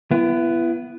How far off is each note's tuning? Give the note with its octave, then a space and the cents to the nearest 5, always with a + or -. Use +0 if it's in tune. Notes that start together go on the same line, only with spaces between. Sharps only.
B3 +0 E4 +35